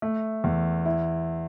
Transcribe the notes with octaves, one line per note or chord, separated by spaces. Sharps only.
A3
E2
E4